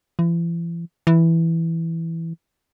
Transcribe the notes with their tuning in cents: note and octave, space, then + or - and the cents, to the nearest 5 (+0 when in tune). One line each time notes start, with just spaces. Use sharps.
E3 +40
E3 +0